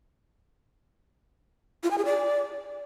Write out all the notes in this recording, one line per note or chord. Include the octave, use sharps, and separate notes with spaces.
F4
G#5
G#4
D5